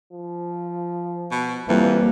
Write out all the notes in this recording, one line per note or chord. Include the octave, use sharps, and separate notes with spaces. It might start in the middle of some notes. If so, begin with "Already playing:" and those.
F3
B2
F2 E3 G3 A#3